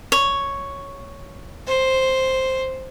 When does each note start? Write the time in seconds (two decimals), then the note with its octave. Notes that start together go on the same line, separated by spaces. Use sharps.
0.12 C#5
1.67 C5